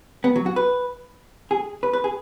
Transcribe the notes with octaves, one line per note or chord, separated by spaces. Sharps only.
B3
F#3
F#4
B4
G#4
B4
B4
G#4